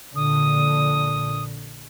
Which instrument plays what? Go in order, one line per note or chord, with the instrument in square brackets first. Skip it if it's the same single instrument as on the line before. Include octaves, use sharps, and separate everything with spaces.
[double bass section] A#1 A#2 D3 [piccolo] D#6